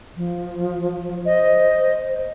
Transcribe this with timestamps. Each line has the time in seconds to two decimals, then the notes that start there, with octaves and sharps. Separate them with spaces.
0.16 F3
1.25 C5 D#5